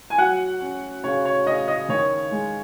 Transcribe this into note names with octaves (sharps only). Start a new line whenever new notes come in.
G#5
F#3 F#5
C#4
C#3 C#5
C#5
C#3 D#5
D#5
D#3 C#5
G#3